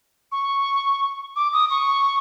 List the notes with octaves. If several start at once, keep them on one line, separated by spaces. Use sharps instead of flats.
C#6
D6
D#6
C#6